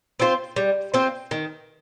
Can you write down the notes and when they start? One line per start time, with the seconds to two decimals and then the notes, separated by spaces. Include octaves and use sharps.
0.20 C4 F4 C5
0.56 G3
0.94 C4 F4 C5
1.31 D#3